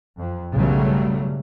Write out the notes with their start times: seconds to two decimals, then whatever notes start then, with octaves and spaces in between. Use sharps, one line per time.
0.18 F2
0.53 B1 G2 C#3 F#3 G3 A3